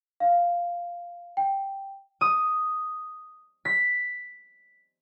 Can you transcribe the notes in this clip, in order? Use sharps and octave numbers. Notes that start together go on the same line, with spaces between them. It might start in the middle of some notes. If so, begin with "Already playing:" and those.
F5
G5
D#6
B6